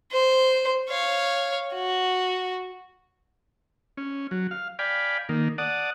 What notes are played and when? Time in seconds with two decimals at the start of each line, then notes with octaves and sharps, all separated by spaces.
0.12 C5
0.89 C#5 F5
1.74 F#4
3.97 C#4
4.31 F#3
4.51 F5
4.79 D5 F5 G5 G#5 B5
5.29 D#3 A#3
5.58 D5 F#5 A5 D#6